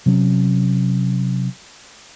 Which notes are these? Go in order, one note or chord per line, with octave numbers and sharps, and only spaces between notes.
C3 F#3 C#4